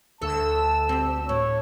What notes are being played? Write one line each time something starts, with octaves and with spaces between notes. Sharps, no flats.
D2 A4 A5 E6
C4 G4
A2 C#5